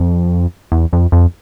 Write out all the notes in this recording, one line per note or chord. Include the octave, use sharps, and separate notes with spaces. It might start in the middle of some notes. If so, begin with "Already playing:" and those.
Already playing: F2
E2
F2
F2